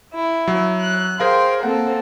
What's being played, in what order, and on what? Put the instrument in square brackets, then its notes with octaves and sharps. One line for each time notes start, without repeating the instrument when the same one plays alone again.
[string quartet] E4
[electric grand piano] F#3
[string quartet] F#6
[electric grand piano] G#4 A#4 F5 [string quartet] C5 G5
[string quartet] A#3 C4 A4 [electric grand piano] F#5